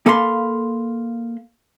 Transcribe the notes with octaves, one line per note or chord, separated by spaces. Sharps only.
A#3 A4 F5 B5 C6